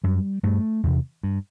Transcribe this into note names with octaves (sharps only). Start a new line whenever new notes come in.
F#2 G3
G2 A3
E2 C3
G2